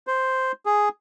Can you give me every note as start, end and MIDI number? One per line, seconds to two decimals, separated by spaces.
0.07 0.52 72
0.66 0.89 68